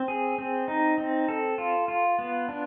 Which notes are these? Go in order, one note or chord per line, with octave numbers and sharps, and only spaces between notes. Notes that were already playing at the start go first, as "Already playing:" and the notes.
Already playing: C4
G#4
C4
D#4
C4
A4
F4
F4
B3
D4